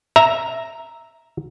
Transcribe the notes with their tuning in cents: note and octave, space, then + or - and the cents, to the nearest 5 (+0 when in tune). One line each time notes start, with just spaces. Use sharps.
E5 +0 A#5 +0